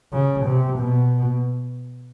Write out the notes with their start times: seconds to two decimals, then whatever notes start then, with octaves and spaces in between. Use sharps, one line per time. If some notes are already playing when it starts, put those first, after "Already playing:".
0.13 C#3
0.46 C3
0.79 B2